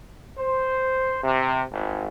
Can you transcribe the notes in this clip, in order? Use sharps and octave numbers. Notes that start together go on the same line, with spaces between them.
C5
C3
G#1